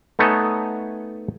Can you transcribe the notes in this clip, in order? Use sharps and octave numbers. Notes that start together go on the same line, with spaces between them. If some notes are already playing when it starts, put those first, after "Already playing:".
A3 B3 D#4 A4 C#5 G#5